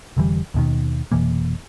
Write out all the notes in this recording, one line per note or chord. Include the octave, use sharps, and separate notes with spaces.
F1 D3 E3 G3
D#2 B2 D#3
F1 B2 E3 A#3